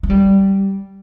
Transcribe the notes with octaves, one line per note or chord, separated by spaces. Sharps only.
A3
G3